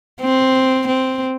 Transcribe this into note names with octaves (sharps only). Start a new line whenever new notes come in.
C4
C4